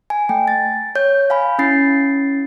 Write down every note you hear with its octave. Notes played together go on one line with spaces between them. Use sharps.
G#5
A3 G5
A6
C#5 G6
F5 G#5 B5
C#4 E4 A6 C7